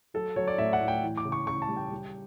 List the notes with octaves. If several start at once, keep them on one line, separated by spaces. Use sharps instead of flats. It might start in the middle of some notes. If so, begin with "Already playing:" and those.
F#3 A4
F#3 C#5
D5
A2 E5
F#5
A2
G5
E3
D6
C#3
C#6
C#3 C#6
A5
G3
G5
G3